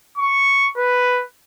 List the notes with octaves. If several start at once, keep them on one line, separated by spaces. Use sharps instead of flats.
C#6
B4